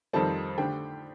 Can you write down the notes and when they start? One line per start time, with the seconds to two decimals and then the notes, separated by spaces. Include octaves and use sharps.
0.13 F2 D#3 G3 C4 A4 A5
0.58 D3 A3 D4 G4 G5